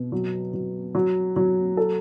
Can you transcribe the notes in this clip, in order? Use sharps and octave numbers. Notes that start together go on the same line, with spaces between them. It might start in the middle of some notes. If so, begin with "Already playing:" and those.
Already playing: B2
F#3
F#3
F#3
F#3
A4